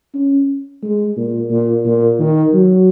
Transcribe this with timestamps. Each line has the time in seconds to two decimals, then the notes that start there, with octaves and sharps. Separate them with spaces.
0.14 C#4
0.83 G#3
1.16 A#2
1.51 A#2
1.85 A#2
2.19 D#3
2.53 F#3